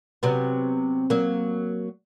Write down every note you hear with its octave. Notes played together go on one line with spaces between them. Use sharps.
C3 F#3 B3
F#3 A#3